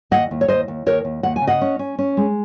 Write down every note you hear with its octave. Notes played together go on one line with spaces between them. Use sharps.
D#2 D#5 F#5
D#2
C#5
D#2 C5 D#5
D#2
D#2 A#4 C#5
D#2
D#2 F#5
G#5
C#3
D#5 F#5
C#4
C#4
C#4
G#3